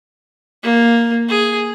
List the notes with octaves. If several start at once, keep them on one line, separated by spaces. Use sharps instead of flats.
A#3
G#4